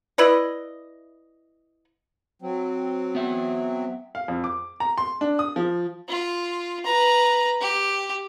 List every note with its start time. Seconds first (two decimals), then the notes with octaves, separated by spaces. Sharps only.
0.18 E4 B4 D5 D#5
2.41 F#3 C4
3.15 B3 E5
4.15 F5
4.28 F2
4.44 D6
4.80 A#5
4.98 C6
5.21 D4
5.39 D#6
5.56 F3
6.09 F4
6.85 B4 A#5
7.61 G4